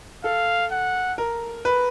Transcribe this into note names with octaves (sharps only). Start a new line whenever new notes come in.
A4 F5
F#5
A#4
B4